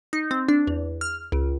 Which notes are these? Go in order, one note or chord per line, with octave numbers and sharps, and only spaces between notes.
D#4
C4
D4
E2
F6
C#2